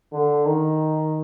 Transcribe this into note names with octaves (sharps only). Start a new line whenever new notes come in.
D3
D#3